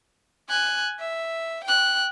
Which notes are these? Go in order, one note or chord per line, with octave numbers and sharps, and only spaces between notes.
G#5 F#6
E5
G5 F#6